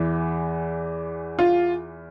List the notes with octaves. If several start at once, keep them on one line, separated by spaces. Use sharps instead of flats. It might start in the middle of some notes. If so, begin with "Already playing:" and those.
Already playing: E2 E3
F4